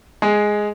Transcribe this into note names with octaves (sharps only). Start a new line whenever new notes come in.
G#3 G#4